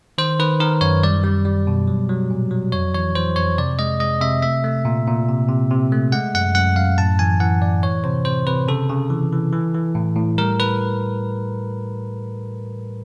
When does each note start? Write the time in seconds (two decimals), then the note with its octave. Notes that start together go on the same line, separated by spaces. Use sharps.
0.18 D#3 C5
0.39 D#3 B4
0.60 D#3 A#4
0.81 F#2 C#5
1.03 G3 D5
1.24 G3
1.45 G3
1.67 B2
1.88 F#3
2.09 F#3
2.30 A#2
2.51 F#3
2.72 F2 C#5
2.94 E3 C#5
3.15 E3 C5
3.36 F2 C#5
3.58 C3 D5
3.79 G#3 D#5
4.00 G#3 D#5
4.21 C3 E5
4.42 A3 E5
4.64 A3
4.85 A#2
5.07 A#2
5.28 C3
5.49 C3
5.71 C3
5.92 A3
6.12 G#3 F#5
6.34 F#2 F#5
6.55 F#2 F#5
6.76 F#2 F5
6.98 A2 A5
7.19 E3 G#5
7.40 E3 F#5
7.61 A2 D5
7.82 E3 C#5
8.04 C3 C5
8.25 C3 C5
8.47 C3 B4
8.68 C#3 A4
8.89 C#3
9.10 E3
9.32 E3
9.53 E3
9.74 E3
9.95 A2
10.16 A2
10.38 G3 A#4
10.60 B4